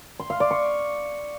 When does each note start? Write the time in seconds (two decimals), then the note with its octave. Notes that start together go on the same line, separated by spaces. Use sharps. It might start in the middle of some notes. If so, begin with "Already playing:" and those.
0.20 C6
0.30 F5
0.40 D5
0.51 C#6